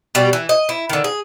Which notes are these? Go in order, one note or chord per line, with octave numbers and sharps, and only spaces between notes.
B2 G3 G4
E3
D#5
E4
D3 D#3
G#4